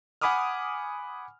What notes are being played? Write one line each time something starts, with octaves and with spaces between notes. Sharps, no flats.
F#5 G#5 B5 D6 D#6 F6